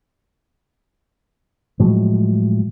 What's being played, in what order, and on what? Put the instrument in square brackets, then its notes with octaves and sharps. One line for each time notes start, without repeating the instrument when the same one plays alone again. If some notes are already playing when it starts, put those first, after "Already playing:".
[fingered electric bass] A2 F3 F#3 G#3